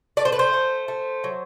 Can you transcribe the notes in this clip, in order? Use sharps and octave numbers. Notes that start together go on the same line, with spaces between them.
A3 D5
C5
B4
C5
A3
A3
F#3